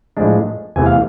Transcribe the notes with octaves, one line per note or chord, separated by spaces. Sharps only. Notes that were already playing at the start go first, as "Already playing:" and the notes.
A2 F3 G#3 D4
E2 C3 E3 A3 G#5
F5